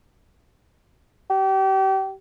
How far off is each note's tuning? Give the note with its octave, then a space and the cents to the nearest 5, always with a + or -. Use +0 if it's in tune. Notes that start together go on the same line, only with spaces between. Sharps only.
G4 -30